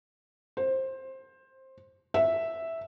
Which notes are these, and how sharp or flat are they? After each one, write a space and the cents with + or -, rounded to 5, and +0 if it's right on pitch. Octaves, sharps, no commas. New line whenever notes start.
C5 +15
E5 -5